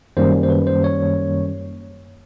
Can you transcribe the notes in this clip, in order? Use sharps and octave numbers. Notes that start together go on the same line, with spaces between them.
F#2 D#3 G3 A#3 C#4 C5
C5
B4
C5
C#5